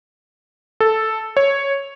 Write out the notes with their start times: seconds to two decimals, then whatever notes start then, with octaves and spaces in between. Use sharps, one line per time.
0.80 A4
1.37 C#5